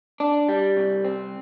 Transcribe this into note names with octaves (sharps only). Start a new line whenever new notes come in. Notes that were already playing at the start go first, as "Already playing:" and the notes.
D4
G3
C2
C4